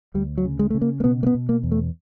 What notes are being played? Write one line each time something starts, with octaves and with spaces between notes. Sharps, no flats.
D2 G3
F#3
C#3
G#3
C#3 A3
A#3
A#3
B2 B3
A#3
B3
B2
A#3
E2
A3